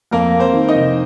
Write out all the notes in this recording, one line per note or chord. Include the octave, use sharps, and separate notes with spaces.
F2 A#3 A#4
A#3
C4 C5
D#3
D#4 D#5
F1